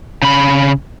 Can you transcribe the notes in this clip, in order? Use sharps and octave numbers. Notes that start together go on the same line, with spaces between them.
C#3 B5